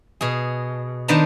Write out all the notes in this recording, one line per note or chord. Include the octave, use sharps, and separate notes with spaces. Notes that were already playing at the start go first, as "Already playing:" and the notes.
B2 G#4
D#3 B3 D4 C5 A5 A#5